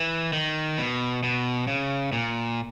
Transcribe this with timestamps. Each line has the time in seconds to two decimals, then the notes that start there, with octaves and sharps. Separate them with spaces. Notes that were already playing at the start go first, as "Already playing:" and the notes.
Already playing: E3
0.33 D#3
0.78 B2
1.23 B2
1.67 C#3
2.12 A#2